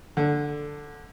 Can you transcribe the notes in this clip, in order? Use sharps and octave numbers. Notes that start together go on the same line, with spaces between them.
D3